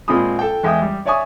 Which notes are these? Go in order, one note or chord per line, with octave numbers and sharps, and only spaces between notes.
A#2 G#3 C4 F4 B5 D#6
A4 G5
E2 G#3 E5 G5 D#6
G3
C#5 D5 E5 G#5 C#6 D#6